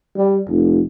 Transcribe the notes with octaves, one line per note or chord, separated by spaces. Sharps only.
G3
F1